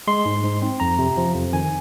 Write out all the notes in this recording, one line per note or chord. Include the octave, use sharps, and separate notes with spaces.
G#3 C6
G#2
G#2
C4
F2 A#5
C3
F3
F2
D#3 G#5